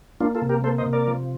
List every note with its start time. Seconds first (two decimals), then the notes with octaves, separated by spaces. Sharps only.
0.20 A#3 D4 F4
0.35 F4 A4
0.42 C3
0.49 G4 A#4
0.64 A#3 A4 C5
0.78 C5 D#5
0.86 C3
0.93 A#4 D5
1.07 F3